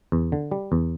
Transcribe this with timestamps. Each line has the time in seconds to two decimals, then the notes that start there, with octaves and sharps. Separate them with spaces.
0.12 E2
0.32 D3
0.51 G3
0.72 E2